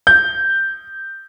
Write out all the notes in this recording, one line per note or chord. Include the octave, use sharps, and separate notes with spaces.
G6